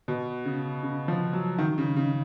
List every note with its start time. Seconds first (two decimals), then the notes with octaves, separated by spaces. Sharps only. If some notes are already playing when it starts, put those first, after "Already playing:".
0.08 B2
0.46 C#3
0.83 C#3
1.08 F3
1.33 F#3
1.58 D#3
1.78 C#3
1.96 C#3